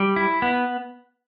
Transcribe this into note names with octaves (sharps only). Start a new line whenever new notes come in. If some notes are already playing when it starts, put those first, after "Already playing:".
Already playing: G3
E4
B3